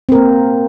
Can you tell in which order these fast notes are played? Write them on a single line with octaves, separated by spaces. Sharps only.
C4 A#4 A#3